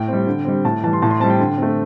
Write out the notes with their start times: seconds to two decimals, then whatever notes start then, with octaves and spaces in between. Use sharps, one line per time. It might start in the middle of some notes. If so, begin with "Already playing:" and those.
Already playing: A2 G5
0.08 G3 C4
0.27 D3
0.45 G3 C4
0.65 A2 A5
0.83 E3 G3 A5
0.93 C6
1.02 A2 A5
1.11 C6
1.20 G3 C4 A5
1.30 G5
1.39 D3
1.58 A3 C4